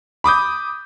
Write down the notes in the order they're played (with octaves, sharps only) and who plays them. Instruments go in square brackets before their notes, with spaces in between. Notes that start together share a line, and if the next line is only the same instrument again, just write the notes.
[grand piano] B5 D6 D#6 G6